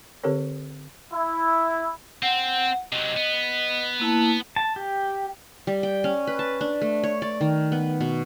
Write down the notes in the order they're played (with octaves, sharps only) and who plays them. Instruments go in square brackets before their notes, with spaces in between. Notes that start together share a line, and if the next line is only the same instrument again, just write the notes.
[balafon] D3 C4 G4 A4 A#4 C#5
[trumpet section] E4
[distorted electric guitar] C4 [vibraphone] F#5
[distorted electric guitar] C3 F#3 [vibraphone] D#5
[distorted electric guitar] B3
[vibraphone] A#3 E4 A5
[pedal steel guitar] A5
G4
[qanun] G3
G5
C#4
B4
A5
D4
A3
C#5
D5
D#3
B3
B2